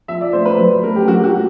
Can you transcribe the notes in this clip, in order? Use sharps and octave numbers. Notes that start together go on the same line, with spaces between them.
F3 E5
D5
A3 C5
B4
F#3
A3 A#4
G4
F#3 F#4
G4
F#4
A3